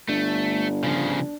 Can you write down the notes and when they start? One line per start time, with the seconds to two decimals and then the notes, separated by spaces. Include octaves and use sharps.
0.08 G1 A3 D4
0.84 C#3 F3